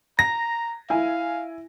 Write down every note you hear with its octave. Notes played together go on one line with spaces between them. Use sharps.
A#5 A#6
E4 F5 G#5